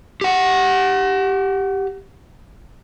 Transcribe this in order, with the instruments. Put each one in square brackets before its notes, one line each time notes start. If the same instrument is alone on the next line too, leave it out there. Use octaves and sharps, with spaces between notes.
[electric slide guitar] G4 F#5